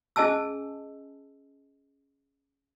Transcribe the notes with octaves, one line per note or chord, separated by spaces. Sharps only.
C#4 G#4 D#5 G#5 A5 E6